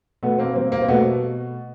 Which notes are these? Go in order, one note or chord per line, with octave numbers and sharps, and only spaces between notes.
B2 A3 B3
A#3 C4
G3 A#3 C4
A#3
C4
B2 A3 B3